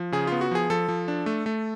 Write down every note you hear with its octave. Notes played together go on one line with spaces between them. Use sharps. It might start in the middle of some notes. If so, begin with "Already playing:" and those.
Already playing: F3
C#3 G#4
B3 F4
F#4
F3 G#4
F3 A4
F3
D4
A3
A3